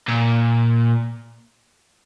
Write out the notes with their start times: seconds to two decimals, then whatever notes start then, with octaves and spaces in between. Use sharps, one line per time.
0.08 A#2